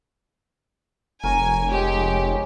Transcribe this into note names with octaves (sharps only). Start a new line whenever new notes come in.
F1 A#4 C#5 G#5 A#5
G#3 G4 C#5